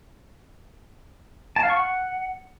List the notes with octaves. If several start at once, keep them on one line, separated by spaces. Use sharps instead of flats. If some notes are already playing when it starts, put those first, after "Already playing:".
A5
F5
C#6
F#5